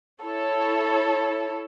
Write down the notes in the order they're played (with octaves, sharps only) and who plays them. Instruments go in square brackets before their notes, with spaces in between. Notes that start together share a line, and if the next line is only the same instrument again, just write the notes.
[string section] E4 A4 C#5